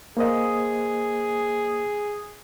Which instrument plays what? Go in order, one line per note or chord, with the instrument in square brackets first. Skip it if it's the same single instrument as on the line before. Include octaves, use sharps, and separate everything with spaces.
[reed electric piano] A#3 C5 D#5 [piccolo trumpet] G#4